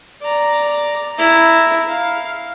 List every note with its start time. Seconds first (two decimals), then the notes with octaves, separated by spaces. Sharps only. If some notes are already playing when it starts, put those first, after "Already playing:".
0.22 D5 A#5
1.18 E4 A#5
1.88 F5